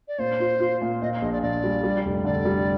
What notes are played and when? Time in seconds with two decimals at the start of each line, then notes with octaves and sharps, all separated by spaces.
0.08 D5
0.19 A#2 C5
0.40 F4
0.60 F4
0.81 A#2
1.02 A#2 D#5
1.22 A#1 D#5
1.32 D5
1.43 A#1 D5
1.64 G3
1.84 G3
2.05 F1
2.25 D3 D5
2.45 G3